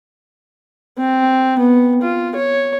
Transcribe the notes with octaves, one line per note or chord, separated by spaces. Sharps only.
C4
B3
F4
C#5